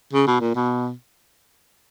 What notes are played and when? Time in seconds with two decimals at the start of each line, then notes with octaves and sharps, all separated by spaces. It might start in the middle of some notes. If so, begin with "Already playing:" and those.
0.13 C#3
0.27 B2
0.40 A#2
0.55 B2